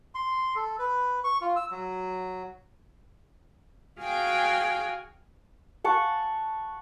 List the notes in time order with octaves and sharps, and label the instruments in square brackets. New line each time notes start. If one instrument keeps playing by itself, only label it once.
[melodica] C6
A4
B4
C#6
F4
E6
F#3
[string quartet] F#4 G#4 F5 G5 G#5
[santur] F#5 A5 C#6